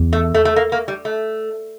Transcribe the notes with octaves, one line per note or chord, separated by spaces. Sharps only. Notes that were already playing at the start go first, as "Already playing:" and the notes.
Already playing: E2
A3
A3
A3
A#3
A#3
G3
A3